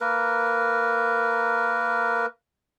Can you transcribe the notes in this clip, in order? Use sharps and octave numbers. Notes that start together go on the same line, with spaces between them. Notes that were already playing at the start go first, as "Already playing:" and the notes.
A#3 A#4 B4